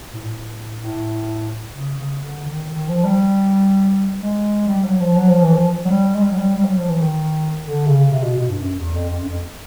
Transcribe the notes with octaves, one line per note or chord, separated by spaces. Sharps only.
A2
A2
A2
C#3
C#3
D3
D#3
D#3
F3
G3
G#3
G3
F#3
F3
F#3
F3
E3
F3
F#3
G3
G#3
G3
F#3
G3
G3
F#3
F3
E3
D#3
D3
C#3
C3
B2
B2
G2
F#2
E2
F2
F2
F#2
F2